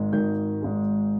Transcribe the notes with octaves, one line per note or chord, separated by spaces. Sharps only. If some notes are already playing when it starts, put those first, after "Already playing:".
Already playing: G#1 G#2 D#3 G#3
G#1 G#2 D#3 G#3 G6
G#1 G#2 D#3 G#3